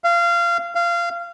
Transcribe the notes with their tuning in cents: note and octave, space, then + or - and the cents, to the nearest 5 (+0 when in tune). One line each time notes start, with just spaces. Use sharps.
F5 -25
F5 -20